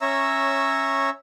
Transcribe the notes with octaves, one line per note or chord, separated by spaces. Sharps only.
C#4 C#5 E5 A#5 E6